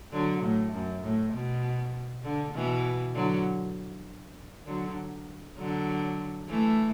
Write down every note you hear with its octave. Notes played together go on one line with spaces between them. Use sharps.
D3 F#3
A2
F#2
A2
B2
D3
B2 E3
D3 F#3
D3 F#3
D3 F#3
E3 A3